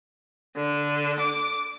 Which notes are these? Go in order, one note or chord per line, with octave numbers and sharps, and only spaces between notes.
D3
D6